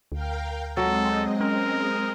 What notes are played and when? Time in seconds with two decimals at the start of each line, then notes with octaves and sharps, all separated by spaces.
0.12 D2 A#4 F5 G5
0.77 F#3 G#3 C4 A4 D#5
1.41 C#4 A#4